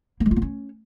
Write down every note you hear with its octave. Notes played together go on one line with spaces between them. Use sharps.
A#3
G#3
F4
B3
C#4